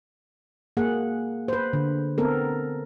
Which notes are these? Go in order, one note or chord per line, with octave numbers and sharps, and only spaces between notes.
A#3 G#4 F#5
B4 C5
D3
B3 C4 A4 A#4